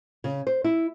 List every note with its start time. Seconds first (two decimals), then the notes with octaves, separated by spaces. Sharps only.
0.24 C#3
0.47 C5
0.64 E4